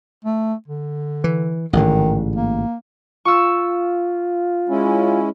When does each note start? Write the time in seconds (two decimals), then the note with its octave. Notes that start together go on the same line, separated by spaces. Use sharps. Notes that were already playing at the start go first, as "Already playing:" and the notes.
0.24 A3
0.68 D3
1.24 E3
1.73 A1 G#2 D3 D#3
2.35 A#3
3.25 F4 C#6 E6
4.69 G#3 C#4 E4